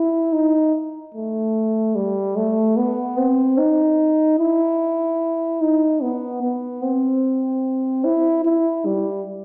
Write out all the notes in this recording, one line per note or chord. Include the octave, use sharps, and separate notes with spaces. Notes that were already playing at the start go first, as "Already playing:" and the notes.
Already playing: E4
D#4
A3
G3
A3
B3
C4
D#4
E4
D#4
B3
B3
C4
E4
E4
G3